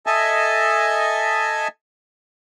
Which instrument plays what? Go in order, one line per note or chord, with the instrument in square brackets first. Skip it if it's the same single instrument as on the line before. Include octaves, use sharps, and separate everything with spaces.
[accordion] A4 D#5 E5 G#5 A5